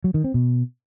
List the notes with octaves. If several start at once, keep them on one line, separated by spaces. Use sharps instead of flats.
F#3
D#3
C4
B2